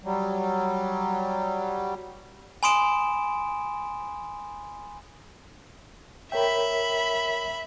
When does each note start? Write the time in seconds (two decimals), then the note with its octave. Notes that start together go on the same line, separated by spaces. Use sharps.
0.04 F#3 G3
2.63 G#5 B5 C6 D#6 D7 E7
6.32 A#4 C#5 E5 G5 B5